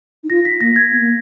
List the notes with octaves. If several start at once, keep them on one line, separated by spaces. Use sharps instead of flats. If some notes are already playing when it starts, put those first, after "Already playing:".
D#4
F4 A#6
B6
A#3 A#6
G#6
B3
A#3